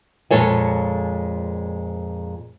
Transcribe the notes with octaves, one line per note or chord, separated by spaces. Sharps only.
F2 A#2 G#3 A4 C#5 G#5